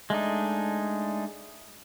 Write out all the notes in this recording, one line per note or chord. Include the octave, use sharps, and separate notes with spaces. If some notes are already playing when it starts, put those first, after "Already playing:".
G#3 A3 D4 D#4